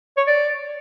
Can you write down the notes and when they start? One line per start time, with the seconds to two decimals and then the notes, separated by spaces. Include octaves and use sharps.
0.17 C#5
0.27 D5